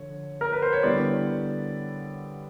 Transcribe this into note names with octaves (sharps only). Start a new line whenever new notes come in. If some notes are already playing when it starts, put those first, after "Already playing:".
Already playing: D3 F3 C#5
A#4
B4
C5
C#5
D3 G3 B3 E4 D5